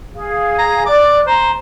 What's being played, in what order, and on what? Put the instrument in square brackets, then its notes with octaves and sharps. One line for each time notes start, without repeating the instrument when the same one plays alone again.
[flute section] G#4 F5
[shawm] A#5
[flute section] D5 F#6 [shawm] D6
[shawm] C5 [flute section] A#5